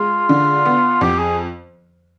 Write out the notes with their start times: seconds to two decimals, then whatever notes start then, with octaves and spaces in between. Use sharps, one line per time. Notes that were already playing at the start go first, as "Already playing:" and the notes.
Already playing: G#3 F4
0.29 D3
0.65 B3
1.01 F2 G4
1.19 G#4